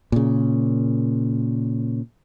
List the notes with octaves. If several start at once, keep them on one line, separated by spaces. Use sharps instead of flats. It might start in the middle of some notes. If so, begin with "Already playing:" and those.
A#2 C#3